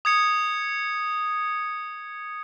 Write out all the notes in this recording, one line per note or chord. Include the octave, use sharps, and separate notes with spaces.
D#6 G#6 C#7